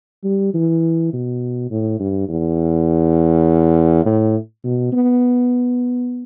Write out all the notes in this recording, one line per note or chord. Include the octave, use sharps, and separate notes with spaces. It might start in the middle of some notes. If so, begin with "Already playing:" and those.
G3
E3
B2
A2
G2
E2
A2
B2
B3